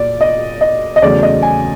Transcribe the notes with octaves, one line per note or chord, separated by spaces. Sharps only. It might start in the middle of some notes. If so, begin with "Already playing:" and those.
Already playing: A#2 A#3 D5
D#5
D#5
D#5
E2 C#3 F#3 A3 D5
D#5
G#5